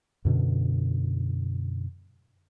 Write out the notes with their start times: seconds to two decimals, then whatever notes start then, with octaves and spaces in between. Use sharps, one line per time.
0.25 F#2 B2 D3